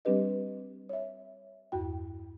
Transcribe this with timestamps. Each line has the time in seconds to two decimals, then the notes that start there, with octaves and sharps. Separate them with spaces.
0.05 G3 C4 D4 G4 B4 D#5
0.89 C#5 E5
1.72 E2 G2 F#4 G5